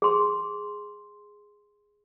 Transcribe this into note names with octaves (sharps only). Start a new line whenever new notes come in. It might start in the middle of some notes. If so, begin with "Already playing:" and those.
G#4 C6